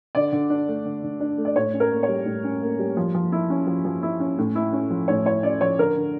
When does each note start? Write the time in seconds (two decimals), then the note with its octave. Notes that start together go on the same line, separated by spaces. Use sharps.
0.15 D3 D5
0.32 D3
0.50 D4
0.68 A3
0.86 D3
1.04 D3
1.20 D4
1.38 A3
1.45 D5
1.56 A2 C#5
1.74 C#4
1.80 A#4
1.92 A#3
2.03 C#5
2.08 G3
2.26 A2
2.44 C#4
2.62 A#3
2.79 G3
2.97 F3
3.14 F3
3.32 E4
3.50 C#4
3.67 F3
3.85 F3
4.02 E4
4.20 C#4
4.38 A2
4.55 E4
4.73 C#4
4.90 F3
5.08 A2 C#5
5.25 E4 C#5
5.43 C#4 D5
5.61 F3 C#5
5.78 D3 A#4
5.96 D3